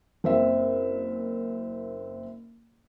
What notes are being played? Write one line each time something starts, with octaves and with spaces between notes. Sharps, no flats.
F#1 C4 E5